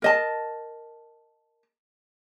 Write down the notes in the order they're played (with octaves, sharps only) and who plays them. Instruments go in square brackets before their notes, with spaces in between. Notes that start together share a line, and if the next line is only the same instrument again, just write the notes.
[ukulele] A#4 D#5 A5